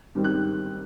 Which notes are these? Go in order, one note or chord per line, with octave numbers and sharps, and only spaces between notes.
G#2 D#3 G3 C4
F#6